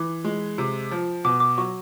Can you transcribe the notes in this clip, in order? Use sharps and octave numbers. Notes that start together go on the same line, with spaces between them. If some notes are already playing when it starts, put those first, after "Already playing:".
Already playing: E3 D6
G#3
C3
F3
B2 D6
D6
F#3 C#6